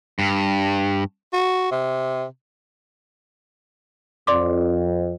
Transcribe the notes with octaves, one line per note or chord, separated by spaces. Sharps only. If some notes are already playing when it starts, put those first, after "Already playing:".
G2
F#4
C3
F2 D5 C6 D6